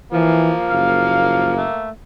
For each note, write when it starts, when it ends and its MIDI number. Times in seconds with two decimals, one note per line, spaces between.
0.12 0.53 52
0.12 1.56 53
0.12 1.91 58
0.70 1.66 30
0.70 1.60 77
1.57 1.91 57